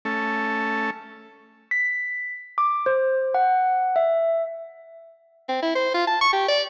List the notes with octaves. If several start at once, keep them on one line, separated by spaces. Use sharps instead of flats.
A3 C#4 A4
B6
D6
C5
F#5
E5
C4
E4
C5
F4
A5
C#6
G4
D5